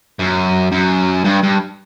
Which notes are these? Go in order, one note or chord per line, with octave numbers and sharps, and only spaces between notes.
F#2
F#2
G2
G2